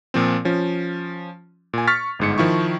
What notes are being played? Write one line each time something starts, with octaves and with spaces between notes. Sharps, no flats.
A#2 F3 C4
F3 C#4
A#2 G#5
C#6 F6 A6 B6
G1 G#2 C#7
D#3 F3 E4 C#6